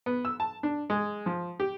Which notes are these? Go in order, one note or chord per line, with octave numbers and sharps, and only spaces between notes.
B3
E6
A5
D4
G#3
F3
G4